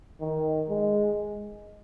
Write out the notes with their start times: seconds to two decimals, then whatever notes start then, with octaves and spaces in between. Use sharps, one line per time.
0.20 D#3
0.69 G#3